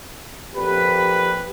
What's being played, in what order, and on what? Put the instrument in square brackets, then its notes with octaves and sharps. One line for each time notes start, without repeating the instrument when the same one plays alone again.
[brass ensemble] F2 A#2 B4 [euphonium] G4